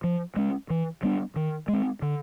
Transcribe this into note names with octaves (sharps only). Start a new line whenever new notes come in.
F3
G#3 C#4
E3
G3 B3 D4
D#3
G#3 C4
D3